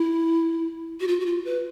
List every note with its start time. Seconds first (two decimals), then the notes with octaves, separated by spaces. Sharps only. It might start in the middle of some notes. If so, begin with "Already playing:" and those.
Already playing: E4
1.00 F#4
1.08 F4
1.20 F#4
1.26 F4
1.45 B4